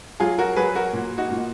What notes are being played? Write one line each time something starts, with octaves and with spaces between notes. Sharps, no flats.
F#3 F4 G#4
F#4 A#4
F#3 G#4 B4
F#4 A#4
A#2
D#4 F#4
A#2